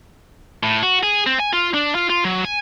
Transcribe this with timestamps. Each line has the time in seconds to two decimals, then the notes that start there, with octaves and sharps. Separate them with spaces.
0.63 A2
0.83 F#4
1.03 G#4
1.26 C4
1.40 G#5
1.53 F4
1.74 D4
1.95 F4
2.10 F4
2.25 F#3
2.45 G#5